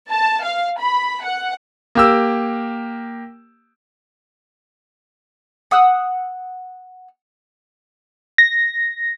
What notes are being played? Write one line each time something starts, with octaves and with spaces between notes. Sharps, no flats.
A5
F5
B5
F#5
A#3 G4 E6
F#5 D#6 E6 F#6
A#6